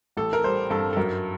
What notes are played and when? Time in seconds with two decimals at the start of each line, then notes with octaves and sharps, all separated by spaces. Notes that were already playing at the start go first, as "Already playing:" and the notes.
0.17 A1 A4
0.33 A#4
0.44 G3 C5
0.70 G2 A4
0.93 A4
0.97 F#2 A#4